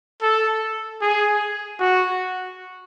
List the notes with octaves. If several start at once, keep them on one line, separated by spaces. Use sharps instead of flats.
A4
G#4
F#4